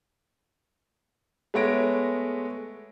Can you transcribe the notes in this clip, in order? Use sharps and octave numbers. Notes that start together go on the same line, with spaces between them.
G#3 A3 B3 C#5 A#6 D7